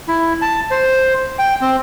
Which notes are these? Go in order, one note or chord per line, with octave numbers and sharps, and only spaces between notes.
E4
A5
C5
G5
C4